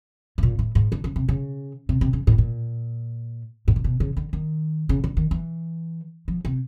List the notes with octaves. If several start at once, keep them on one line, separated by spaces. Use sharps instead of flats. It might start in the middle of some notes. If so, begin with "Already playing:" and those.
A2
A#2
A2
G#2
D3
C#3
C3
C#3
C3
C3
C#3
A2
A#2
A2
A#2
B2
C#3
D3
D#3
C#3
D3
D#3
E3
F3
C3